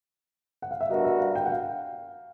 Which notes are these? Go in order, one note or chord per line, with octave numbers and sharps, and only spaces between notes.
F#5
F5
E5
G3 B3 D4 F#4 A#4 D#5
E5
F5
G5
F#5
F5